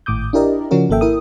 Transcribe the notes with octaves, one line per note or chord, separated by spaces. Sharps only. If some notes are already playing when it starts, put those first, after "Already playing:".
G#1 A2 D6 D#6 G6
D4 E4 G4 A#4 D5 D#5
C#3 F3 C#4 F#4 A#4
G#1 A#3 A4 E5 G5
E4 A#4 D#6